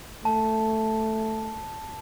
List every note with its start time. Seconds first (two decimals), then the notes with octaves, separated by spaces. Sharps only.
0.25 A3 A5